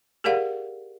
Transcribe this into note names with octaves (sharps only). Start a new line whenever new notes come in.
G4 G#4 A#4 D5 F5 F#5